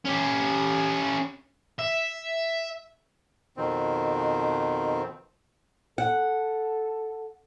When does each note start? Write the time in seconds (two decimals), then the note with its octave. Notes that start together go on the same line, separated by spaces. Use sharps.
0.05 C#4 G4
1.79 E5
3.57 F2 B2 D#3 C4
5.98 A4 F#5